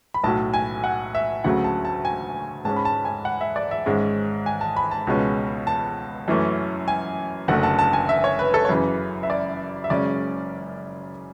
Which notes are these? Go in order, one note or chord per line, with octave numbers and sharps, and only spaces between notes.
B5
B1 A2 F#3 A5
G#5
F#5
E5
D2 C#3 F#3 A3 F#5
A5
A5
G#5
G#2 G#3 C#4 A5
B5
A5
G#5
F#5
E5
D5
E5
G#1 G#2 G#3 C#4
G#5
A5
B5
A5
C#2 B2 G#3 C#4
A5
F#2 E3 A3 C#4
G#5
F#1 F#2 D3 A3 F#5
A5
A5
G#5
E5
C#5
B4
A4
C#5
F#2 C#3 E3 B4
E5
D5
E5
F#1 F#2 C#3 G#3 C#4 D5